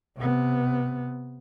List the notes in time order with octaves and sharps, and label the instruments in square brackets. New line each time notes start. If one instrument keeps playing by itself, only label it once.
[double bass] C3 B3